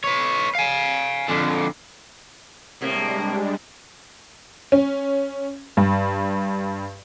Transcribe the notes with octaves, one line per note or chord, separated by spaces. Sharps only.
B4 C#5
F5 G#5
F2 D3
A2 C3 G3 G#3 A#3 D4
C#4
G2